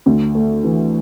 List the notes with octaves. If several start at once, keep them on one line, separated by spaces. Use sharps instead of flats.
D2
A3
E3